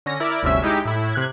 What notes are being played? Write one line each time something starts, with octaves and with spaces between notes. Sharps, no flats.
D3 C#4 A#6
E4 A#4 D5
G1 D2 C3 C#4 E5
G#3 D#4 E4 G4
A2 E4
C3 F#6 G#6